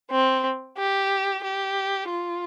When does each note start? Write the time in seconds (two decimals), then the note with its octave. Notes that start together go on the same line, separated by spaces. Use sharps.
0.11 C4
0.78 G4
1.44 G4
2.10 F4